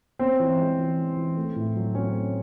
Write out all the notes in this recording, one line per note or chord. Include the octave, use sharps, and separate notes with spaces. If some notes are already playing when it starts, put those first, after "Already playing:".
C4 C#4 C5
E3
G#3
E3
C#4
E3
A3
A2
F#3
C4 C#4 C#5
A3